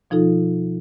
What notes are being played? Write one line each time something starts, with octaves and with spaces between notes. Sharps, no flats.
B2 F3 D#4 F4 A4